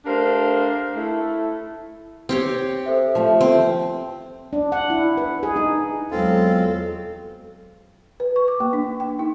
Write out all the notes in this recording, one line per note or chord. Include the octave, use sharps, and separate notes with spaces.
A3 D4 G4 A#4 C5 F5
A3 E4
C4 G4 C#5
A4 C5 E5
F3 A3
C4
D4
F#5
E4
B4
G#4
D#4
E2 F#3 G#3 C4 F4 A4
B4
C#6
D6
A#3
D4
G5
D#4